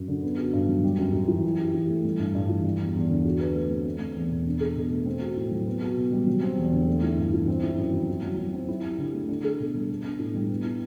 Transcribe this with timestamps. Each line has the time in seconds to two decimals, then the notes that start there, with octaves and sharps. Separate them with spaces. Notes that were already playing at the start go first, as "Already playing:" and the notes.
Already playing: F#2
0.08 D3
0.23 B3
0.38 F#4
0.53 G2
0.69 F#3
0.84 G3
0.98 F#2
1.13 F#2
1.28 E3
1.44 E4
1.59 G4
1.74 E3
1.89 A3
2.05 G3
2.19 G2
2.35 G2
2.49 E3
2.64 G3
2.80 E2
2.95 E2
3.10 D3
3.25 F#4
3.40 B4
3.55 A3
3.70 C4
3.86 A3
4.01 C4
4.16 E2
4.31 B2
4.46 D4
4.61 A4
4.76 B2
4.92 A3
5.06 C4
5.22 F#4
5.37 A2
5.51 F#3
5.67 B3
5.82 F#4
5.97 B2
6.12 G3
6.27 F#3
6.42 C4
6.57 E2
6.73 D3
6.88 A3
7.03 E4
7.17 G2
7.33 E3
7.48 C4
7.63 E4
7.78 F#2
7.93 F#3
8.08 E4
8.23 F#3
8.38 F#3
8.53 C4
8.68 E4
8.84 G4
8.98 D3
9.13 A3
9.29 D4
9.44 A4
9.59 B2
9.75 G3
9.89 B3
10.04 D4
10.19 A2
10.34 G3
10.49 B3
10.65 E4